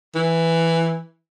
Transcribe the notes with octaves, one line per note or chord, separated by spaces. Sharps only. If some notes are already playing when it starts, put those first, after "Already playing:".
E3